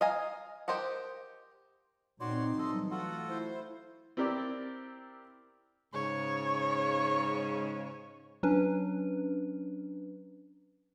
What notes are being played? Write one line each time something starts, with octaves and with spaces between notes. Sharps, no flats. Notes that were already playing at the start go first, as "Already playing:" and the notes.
D#5 F5 G#5 A#5
G4 A#4 C5 D#5 F#5
A#2 C4 D#4 F#4 C#5 D5 C6
E3 F#3 G3 A4 D#5
A3 F4 F#4 A4 F#5
E4 C5
C4 E4 G4 A#4 D5
G#2 C#3 C#5
F#3 C#4 D4 B4